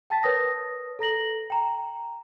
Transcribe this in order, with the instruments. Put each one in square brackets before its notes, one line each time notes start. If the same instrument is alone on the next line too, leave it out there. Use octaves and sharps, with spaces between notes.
[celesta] G5 A5 A6 B6
A#4 B4 C#5 D#6 A#6
A4 A#5 A#6 F#7
G5 A#5